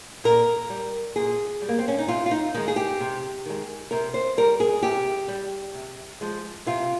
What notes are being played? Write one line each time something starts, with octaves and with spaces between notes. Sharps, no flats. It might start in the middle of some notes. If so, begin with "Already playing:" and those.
A#2 A#4
G3
A#2 G#4
G3
A#3
C4
C#4
D#4
C3 F4
F4
D#4
D#3 G#3 D#4
G#4
G4
C3
D#3 G#3
C3 A#4
C5
G3 A#4
G#4
C3 G4
G3
C3
F3 G#3
C3 F4